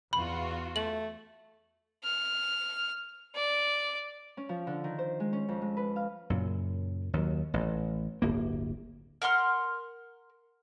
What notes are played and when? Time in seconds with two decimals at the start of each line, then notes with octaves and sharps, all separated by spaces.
0.13 E2 F4 F#4 B5
0.76 A3 F#7
2.04 F6
3.35 D5
4.37 C#4
4.49 F3
4.67 D3
4.84 D#3
4.99 C5
5.20 G#3
5.33 C#4
5.49 F2
5.62 G#3
5.77 B4
5.96 F5
6.30 F#2 A#2 C#3
7.13 D#2 F#3
7.54 A1
8.22 D1 G1 A#3
9.22 A#4 F#5 C6 F6